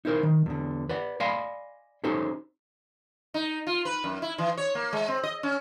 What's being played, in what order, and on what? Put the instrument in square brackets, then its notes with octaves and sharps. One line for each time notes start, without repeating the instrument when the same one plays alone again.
[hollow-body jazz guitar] D#4 E4 A#4 C5
D#3
E2 D3
B4 D5 F#5
D5 D#5 F5 G#5 B5 C6
C#4 D#4 F#4 A4 C5
[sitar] D#4
F4
B4
F#2
E4
E3
C#5
A#3
G#3
C4
D#5
C#4